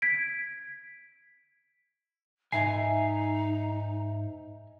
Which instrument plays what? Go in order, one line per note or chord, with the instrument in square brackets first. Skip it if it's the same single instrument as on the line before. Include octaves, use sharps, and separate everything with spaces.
[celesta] G#6 B6 D7
[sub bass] G#2 [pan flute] D#4 [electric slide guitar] D#5 E5 G#5 [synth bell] C7